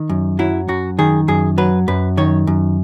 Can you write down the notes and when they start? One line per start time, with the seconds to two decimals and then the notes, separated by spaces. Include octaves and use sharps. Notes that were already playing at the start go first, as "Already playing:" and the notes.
Already playing: D#3
0.09 F#2
0.39 F#3 E4
0.68 F#2 F#4
0.99 D#3 G#4
1.28 F#2 G#4
1.58 F#3 B4
1.88 F#2 B4
2.17 D#3 C#5
2.47 F#2